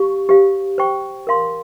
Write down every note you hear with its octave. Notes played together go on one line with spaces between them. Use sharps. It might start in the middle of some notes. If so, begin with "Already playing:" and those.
Already playing: G4 F5 C#6
G4 C5 F5
C5 G5 C#6
A#4 F5 C6